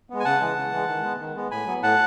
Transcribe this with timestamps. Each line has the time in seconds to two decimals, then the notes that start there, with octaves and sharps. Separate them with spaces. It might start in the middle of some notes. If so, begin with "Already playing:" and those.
0.10 G#3 B3
0.20 G#5
0.25 C#3 F#5 A5
0.40 E3 G#3
0.56 C#3
0.72 E3 G#3
0.89 D#3
1.03 G#3 B3
1.20 D#3
1.36 G#3 B3
1.51 A2 G#5 B5
1.67 F#3 B3
1.82 A2 F#5 A5